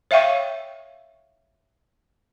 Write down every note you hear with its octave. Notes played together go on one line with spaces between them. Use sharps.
C#5 E5 F5 G5 C#6